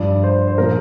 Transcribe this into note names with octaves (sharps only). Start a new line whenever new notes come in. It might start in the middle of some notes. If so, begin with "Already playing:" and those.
Already playing: G2 F3 D5
C5
C5
A#2 F3 A#4